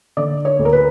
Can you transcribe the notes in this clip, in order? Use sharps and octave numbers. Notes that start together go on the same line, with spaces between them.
D3 D5
C#5
D2
A#4
B4